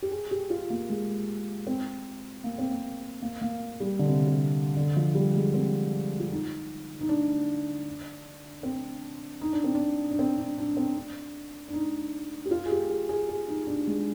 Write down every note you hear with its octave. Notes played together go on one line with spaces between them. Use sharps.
G4
G#4
G4
F4
A#3
G#3
C4
A#3
C4
A#3
A#3
A#3
G3
D3
C3
C3
D3
F3
G3
G#3
C4
F4
D#4
D#4
D4
C4
D#4
D4
C4
D4
D4
C4
D4
D4
C4
D4
D4
D#4
G4
F4
G#4
G4
G#4
G#4
G#4
D#4
D4
G#3